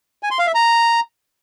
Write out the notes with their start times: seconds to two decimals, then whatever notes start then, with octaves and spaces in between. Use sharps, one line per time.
0.23 G#5
0.31 C6
0.39 F5
0.47 E5
0.55 A#5